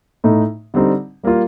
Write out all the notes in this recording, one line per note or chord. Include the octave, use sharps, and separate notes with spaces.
A2 A3 D#4
D3 G3 C4 D#4
G3 A#3 F4